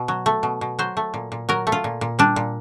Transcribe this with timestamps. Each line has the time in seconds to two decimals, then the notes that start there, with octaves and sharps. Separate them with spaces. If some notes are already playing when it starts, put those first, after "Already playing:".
Already playing: B2
0.08 F#3
0.26 A3
0.43 B2
0.61 B2
0.79 F#3 C5
0.97 A3
1.14 A#2
1.32 A#2
1.49 F#3 A#4
1.67 A3
1.72 F4
1.84 A#2
2.01 A#2
2.19 G3 D4
2.36 A#2